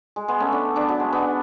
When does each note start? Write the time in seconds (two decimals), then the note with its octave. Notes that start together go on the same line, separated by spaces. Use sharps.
0.16 G#3
0.28 G#3 B3
0.40 A3 C#4
0.52 B3 D4
0.76 B3 D4
0.89 F#3
1.00 G#3
1.12 B3 D4